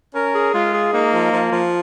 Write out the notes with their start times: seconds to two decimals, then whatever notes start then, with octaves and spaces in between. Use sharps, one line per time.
0.14 C#4 A#4
0.34 G#4
0.54 G#3 F4
0.74 G#4
0.93 A#3 D#4
1.13 F3
1.33 F3
1.52 F3